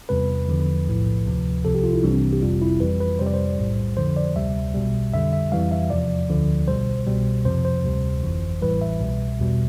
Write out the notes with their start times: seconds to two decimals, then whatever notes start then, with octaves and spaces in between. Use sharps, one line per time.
0.09 E2 C3 G3 B4
0.48 E2 D3 F3
0.87 B1 A2 F3
1.26 D2 C3 F3
1.65 C2 C3 F3 A4
1.75 G4
1.84 F4
1.93 E4
2.04 C2 C3 E3 G3 D4
2.13 C4
2.33 G4
2.42 G1 F2 C3 G3 F4
2.61 E4
2.80 F2 E3 G3 B4
3.00 B4
3.19 F2 C3 G3 C5
3.26 D5
3.34 C5
3.58 B1 A2 G3
3.97 F2 D3 F3 C5
4.17 D5
4.35 D2 C3 G3 E5
4.74 B1 B2 G3
5.13 F2 D3 G3 E5
5.33 E5
5.52 F2 E3 G3 F5
5.71 E5
5.90 E2 C3 F3 D5
6.29 D2 D3 F3
6.68 B1 B2 G3 C5
7.07 C2 B2 G3
7.45 F2 C3 F3 C5
7.65 C5
7.84 D2 C3 G3
8.23 G1 F2 E3
8.62 A1 A2 E3 G3 B4
8.81 E5
9.00 C2 B2 G3
9.39 E2 B2 G3